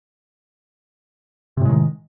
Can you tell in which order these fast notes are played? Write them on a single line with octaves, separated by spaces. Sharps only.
C3 A2 G#3 D#3